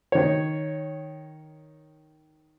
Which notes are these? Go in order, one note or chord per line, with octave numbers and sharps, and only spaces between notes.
D#3 C#5